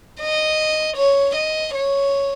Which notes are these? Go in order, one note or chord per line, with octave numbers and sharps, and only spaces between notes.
D#5
C#5
D#5
C#5